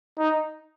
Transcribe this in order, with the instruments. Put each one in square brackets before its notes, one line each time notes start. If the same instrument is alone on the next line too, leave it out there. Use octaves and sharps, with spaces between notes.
[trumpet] D#4